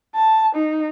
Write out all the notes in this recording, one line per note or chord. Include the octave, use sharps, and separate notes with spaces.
A5
D#4